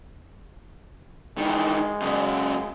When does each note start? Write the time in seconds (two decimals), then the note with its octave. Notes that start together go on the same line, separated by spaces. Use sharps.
1.38 D#3 E3 G#3
2.02 F#2 C#3